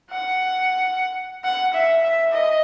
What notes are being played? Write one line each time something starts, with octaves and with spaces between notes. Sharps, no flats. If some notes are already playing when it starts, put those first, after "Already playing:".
F#5
F#5
E5
E5
D#5